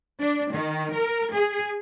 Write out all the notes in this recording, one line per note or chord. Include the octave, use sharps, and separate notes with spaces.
D4
D#3
A#4
G#4